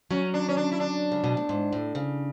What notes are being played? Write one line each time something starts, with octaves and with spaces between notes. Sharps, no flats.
F#3 C#4
D4
C#4
D4
E4
D4
C#3
B2
A2
G#2
A2
C#3